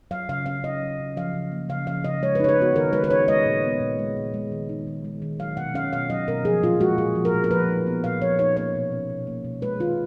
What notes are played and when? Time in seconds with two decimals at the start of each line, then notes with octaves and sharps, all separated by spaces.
0.11 F#3 F5
0.29 C#3 F5
0.46 C#4 F5
0.63 C#3 D#5
0.82 F#3
1.00 C#3
1.17 F3 F5
1.34 C#3
1.52 A#3
1.69 C#3 F5
1.87 F3 F5
2.04 C#3 D#5
2.22 G#3 C#5
2.35 B4
2.40 D#4 C#5
2.49 B4
2.58 B3 F#4
2.75 D#3 A#4
2.92 G#3 B4
3.04 B4
3.11 D#4 C#5
3.28 G#3 D#5
3.46 A#2
3.64 B3
3.80 A#2
3.99 G#3
4.17 A#2
4.34 G#3
4.52 D#3
4.69 D#4
4.87 D#3
5.04 G#3
5.22 D#3
5.39 F#3 F5
5.57 B2 F#5
5.74 C#4 F5
5.93 B2 F5
6.10 F#3 D#5
6.28 B2 A#4
6.45 F3 G#4
6.62 A#2 F4
6.80 G#3 F#4
6.98 A#2 G#4
7.15 F3
7.25 A#4
7.34 A#2
7.44 A#4
7.51 F3 B4
7.68 D#4
7.87 B3
8.04 A#2 F5
8.21 F3 C#5
8.39 D#4 C#5
8.56 A#3 C#5
8.75 B2
8.92 C#4
9.09 B2
9.27 A#3
9.45 B2
9.62 G#3 B4
9.80 D#3 F4